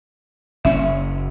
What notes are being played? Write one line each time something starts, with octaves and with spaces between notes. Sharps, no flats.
F#1 C#4 E5